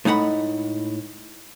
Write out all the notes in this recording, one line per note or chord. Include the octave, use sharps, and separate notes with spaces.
A2 G#3 D#4 F#5 B5